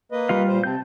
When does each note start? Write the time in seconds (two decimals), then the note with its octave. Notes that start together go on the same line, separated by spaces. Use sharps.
0.12 A#3 B4 D#5
0.29 G3 F4 F5
0.48 A#2 C5
0.64 C3 C4 A5 G6